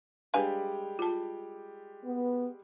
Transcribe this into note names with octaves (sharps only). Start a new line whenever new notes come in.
G3 G#3 D4 G4 B4 F5 G#5
F4 A5
B3